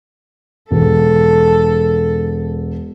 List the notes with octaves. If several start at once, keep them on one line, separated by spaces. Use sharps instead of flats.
E1 A4